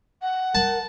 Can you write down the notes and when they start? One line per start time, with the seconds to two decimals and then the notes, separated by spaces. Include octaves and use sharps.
0.22 F#5
0.55 A#4 A5